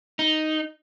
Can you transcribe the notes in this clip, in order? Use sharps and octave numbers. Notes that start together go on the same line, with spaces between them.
D#4